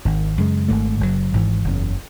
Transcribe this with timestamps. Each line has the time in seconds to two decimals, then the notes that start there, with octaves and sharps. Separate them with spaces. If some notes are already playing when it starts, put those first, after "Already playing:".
0.05 G#1 G#2 D#3
0.37 F#2 C#3 G#3
0.68 G#1 G#2 D#3 A3
1.00 F#1 F#2 C#3 F#3
1.33 G#1 G#2 E3
1.64 F#1 E2 C#3